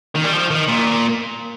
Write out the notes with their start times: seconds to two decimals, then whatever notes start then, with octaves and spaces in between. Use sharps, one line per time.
0.15 D#3
0.24 G3
0.33 F3
0.51 D#3
0.68 A#2